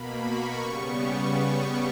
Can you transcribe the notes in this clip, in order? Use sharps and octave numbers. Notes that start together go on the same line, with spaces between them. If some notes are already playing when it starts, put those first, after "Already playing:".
Already playing: B2 A#3 B5
C#6
C#3 G3 B3